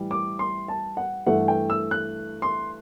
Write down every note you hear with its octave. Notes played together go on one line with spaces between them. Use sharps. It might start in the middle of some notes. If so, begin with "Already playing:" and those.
Already playing: A2 E3 G3
D6
C6
A5
F#5
G2 E3 A3 F#5
G5
E6
F#6
C6